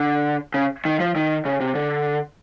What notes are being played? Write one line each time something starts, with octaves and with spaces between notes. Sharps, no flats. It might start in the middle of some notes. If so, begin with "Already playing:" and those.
Already playing: D3
C#3
D#3
F3
D#3
C#3
C3
D3